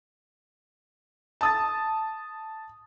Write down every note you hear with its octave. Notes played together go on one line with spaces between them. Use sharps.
A5 D#6 A6